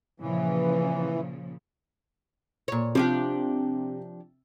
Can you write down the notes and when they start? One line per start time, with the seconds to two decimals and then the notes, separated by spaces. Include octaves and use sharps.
0.20 A#2 C#3 E3 F3
2.68 A#2 C#5
2.95 C3 F3 D4 G4